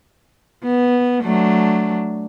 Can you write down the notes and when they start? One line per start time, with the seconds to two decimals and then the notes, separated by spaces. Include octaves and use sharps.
0.63 B3
1.23 F#3 A3 D4